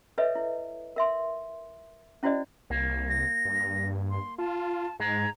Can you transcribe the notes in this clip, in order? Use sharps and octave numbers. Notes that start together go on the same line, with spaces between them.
A4 B4 C#5 D#5 E5
E4
A#4 E5 C6
C#4 E4 F#4 C5 D5 D#5
C2 A#3
A#6
G2
C6
F4 A5
G#2 G#3 A#5